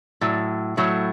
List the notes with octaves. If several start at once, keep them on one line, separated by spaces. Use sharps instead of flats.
A2 F#3
A2 F#3 A3